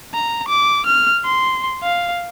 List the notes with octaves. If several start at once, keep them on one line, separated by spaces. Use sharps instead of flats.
A#5
D6
F6
C6
F5